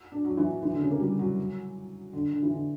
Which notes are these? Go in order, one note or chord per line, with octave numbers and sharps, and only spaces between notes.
D4
F#3
E3
F#3
E3
D3
C#3
A#3
G3
F#3
D3
D3
E3
D3